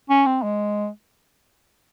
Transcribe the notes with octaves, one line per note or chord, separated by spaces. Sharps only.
C#4
C4
G#3